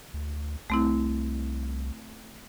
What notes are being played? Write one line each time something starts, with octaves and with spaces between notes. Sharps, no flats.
D2
C2 A3 C4 E4